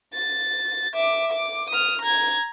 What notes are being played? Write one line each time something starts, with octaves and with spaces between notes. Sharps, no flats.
A6
E5 D6
D6
D#6 F6
A#5 G#6